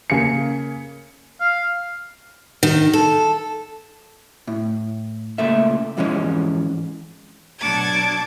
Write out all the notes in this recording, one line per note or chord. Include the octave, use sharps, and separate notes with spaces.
C#3 A#3 G#5 C#7
F5
D#3
A4
A2
C#2 A#2 A3 E5
F2 G#2 E3 G#3 C#4
B2 F#3 D4 A5 D6 G#6